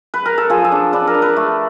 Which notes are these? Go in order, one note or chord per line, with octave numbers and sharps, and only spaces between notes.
B4
A#4
A4
F3 G#4
A4
D4
D4 B4
A#4
D4
B4
A3